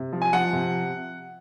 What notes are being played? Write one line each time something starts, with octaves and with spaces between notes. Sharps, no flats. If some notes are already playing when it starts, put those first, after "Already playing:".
Already playing: C3
F3
G#5
F3 F#5
C3